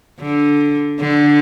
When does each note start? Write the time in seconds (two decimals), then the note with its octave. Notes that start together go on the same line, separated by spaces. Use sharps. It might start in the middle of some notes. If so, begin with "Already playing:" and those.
0.20 D3
1.00 D3